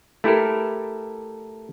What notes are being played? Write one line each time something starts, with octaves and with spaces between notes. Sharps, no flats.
A3 E4 G4 A4 A#4